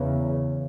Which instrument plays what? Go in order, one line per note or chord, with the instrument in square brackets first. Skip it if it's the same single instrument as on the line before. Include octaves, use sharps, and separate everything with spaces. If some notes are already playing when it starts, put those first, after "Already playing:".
Already playing: [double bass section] E2 C#3